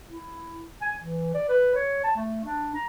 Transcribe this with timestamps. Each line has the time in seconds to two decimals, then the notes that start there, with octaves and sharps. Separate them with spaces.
0.09 E4
0.82 G#5
0.99 E3
1.34 D5
1.49 B4
1.75 C#5
2.04 A5
2.16 A3
2.44 D4
2.75 A#5